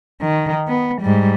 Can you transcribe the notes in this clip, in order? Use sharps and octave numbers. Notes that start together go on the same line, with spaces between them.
D#3
B3
G#2 G3